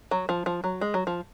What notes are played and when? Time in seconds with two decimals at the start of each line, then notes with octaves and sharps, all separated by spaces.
0.11 F#3
0.29 F3
0.46 F3
0.64 F#3
0.81 G#3
0.94 F#3
1.07 F3